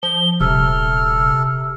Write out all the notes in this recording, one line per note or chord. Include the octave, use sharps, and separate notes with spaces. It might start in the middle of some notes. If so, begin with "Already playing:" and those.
F3 G7
D#1 C3 A4 F6